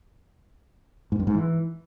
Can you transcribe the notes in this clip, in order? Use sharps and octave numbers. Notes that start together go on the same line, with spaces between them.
G#2
G2
G#2
E3